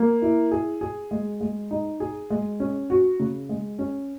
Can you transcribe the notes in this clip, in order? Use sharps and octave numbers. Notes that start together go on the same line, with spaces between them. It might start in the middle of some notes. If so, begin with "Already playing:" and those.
Already playing: A#3
E4
G#4
G#4
G#3
G#3
D#4
G#4
G#3
C#4
F#4
C#3
G#3
C#4